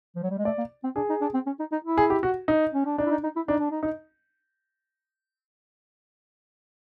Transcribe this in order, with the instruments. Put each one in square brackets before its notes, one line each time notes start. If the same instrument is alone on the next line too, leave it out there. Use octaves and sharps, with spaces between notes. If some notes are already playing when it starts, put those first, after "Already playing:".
[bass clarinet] F3
F#3
G3
G#3
[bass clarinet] A3 [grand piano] D5
[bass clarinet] A#3
C4
[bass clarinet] D4 [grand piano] G#4
[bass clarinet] D#4
D4
C4
C#4
D#4
D#4
E4
[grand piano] G#4
G4
F#4
D#4
[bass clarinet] C#4
D4
[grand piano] D4 [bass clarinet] D#4
[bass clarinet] E4
D#4
D#4
E4
[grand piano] D4 [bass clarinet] D#4
[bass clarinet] D4
D#4
[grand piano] D#4